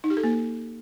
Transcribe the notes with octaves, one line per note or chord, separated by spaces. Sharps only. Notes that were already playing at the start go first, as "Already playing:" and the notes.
D#4
G4
A4
A#3